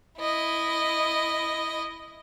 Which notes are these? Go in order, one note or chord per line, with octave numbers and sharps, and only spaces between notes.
E4 D#5